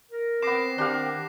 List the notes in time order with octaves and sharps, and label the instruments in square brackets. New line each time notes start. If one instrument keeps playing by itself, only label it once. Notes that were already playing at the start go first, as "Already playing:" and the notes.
[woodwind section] A#4
[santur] B3 D6 [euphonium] C4 [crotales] A#6 C7 E7
[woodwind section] D#3 [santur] D4 G4 F5